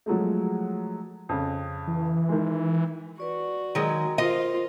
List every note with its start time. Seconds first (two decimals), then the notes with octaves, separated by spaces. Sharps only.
0.06 F3 F#3 G#3 A3
1.29 F2 C#3
1.88 E3
2.29 D#3 G#3
3.18 F#4 B4 D5 C#6
3.75 D#3 F#3 G#3 D#5 A#5
4.18 F4 A#4 C5 D#5